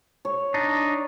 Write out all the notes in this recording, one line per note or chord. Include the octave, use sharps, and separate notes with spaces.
C#5
D4 D#4